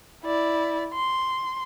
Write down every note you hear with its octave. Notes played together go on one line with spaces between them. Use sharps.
E4 D5
C6